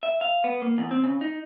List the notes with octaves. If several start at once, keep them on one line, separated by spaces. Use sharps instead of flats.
E5
F5
B3
A#3
E2
C4
C#3
D#4